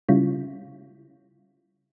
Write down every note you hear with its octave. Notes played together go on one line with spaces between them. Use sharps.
C#3 G3 C#4 E4 F4